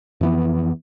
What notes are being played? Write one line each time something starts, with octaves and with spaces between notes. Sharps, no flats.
F2 E3 B3